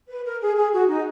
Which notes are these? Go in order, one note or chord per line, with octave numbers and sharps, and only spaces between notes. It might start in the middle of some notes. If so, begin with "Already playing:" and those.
B4
A#4
G#4
G#4
F#4
D#4